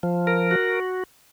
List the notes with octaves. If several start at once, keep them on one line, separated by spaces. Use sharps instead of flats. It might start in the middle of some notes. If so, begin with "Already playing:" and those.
F3
A#4
F#4